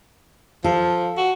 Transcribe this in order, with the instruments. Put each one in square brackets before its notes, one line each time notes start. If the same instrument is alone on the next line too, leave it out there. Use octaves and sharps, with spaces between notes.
[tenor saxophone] F3 [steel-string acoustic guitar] A4
[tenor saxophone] F#4